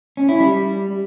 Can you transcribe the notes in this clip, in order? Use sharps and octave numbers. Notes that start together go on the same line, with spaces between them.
C#4
E4
G3